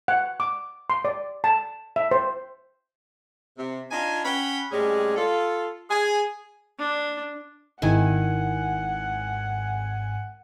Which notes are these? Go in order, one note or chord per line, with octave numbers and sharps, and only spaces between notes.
F#5
D6
C6
D5
A5
E5
C5
C3
D4 D#4 F4 G#5
C#4 F#5 G5 B5
A2 G3 G#3 C4 C#4 G#4
F4 A4
G#4 G#5
D4
G#1 D#3 E4 F#5 G#5